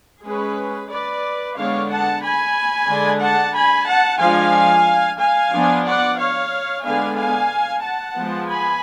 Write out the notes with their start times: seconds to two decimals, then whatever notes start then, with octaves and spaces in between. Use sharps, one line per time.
0.24 G#3 C#4 G#4 B4
0.90 B4 D5
1.56 D3 G#3 B3 D4 C#5 F5
1.90 F#5 A5
2.22 G#5 B5
2.88 D3 G#3 D4
3.21 F#5 A5
3.54 G#5 B5
3.87 F#5 A5
4.20 F3 G#3 D4 F5 G#5
5.19 F5 G#5
5.53 F3 B3 D4
5.85 D5 F#5
6.18 C#5 F5
6.84 D3 G#3 B3 D4 F5 G#5
7.17 F5 G#5
7.83 F#5 A5
8.16 F3 G#3 B3
8.49 G#5 B5